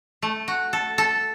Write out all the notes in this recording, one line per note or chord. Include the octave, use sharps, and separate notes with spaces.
A3
F#4
A4
A4